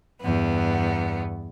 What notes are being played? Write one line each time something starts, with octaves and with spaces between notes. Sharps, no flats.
E2 G2 B3